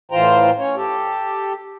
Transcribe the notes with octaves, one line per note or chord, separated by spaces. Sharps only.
A2 E3 F4 C5 G5 A#5
C#4 C#5
G4 A4